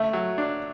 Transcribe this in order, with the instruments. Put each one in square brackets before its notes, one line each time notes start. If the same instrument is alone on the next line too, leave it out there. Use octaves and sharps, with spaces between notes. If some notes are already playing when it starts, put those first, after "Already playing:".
Already playing: [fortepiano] A3 [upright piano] E5
[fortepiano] F#3
D4